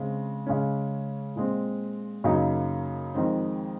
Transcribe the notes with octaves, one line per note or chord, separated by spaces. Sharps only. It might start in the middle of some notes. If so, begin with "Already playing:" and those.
Already playing: C#3 G#3 C4
C#3 G#3 C#4
A#2 G#3 C4
F#2 C#3 F#3 A#3 D#4
F2 D#3 G#3 C4